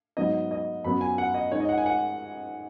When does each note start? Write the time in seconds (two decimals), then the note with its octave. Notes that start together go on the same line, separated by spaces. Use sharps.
0.17 G#2 F#3 B3 D#4 D#5
0.51 D#5
0.84 F#2 F#3 B3 B5
1.01 G#5
1.18 F#5
1.34 D#5
1.52 G#2 G#3 D#4 C#5
1.60 D#5
1.69 F#5
1.78 G#5
1.86 F#5